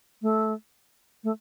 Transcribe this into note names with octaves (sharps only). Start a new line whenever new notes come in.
A3
A3